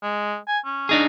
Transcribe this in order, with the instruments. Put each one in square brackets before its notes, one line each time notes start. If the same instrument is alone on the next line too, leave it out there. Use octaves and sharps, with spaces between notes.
[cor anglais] G#3
G#5
C#4
[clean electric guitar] D4 D#4 G#4